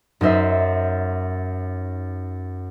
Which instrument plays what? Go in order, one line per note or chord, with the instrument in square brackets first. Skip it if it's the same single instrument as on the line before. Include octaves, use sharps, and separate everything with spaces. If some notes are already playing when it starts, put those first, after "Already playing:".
[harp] F#2 D#4 C5 E5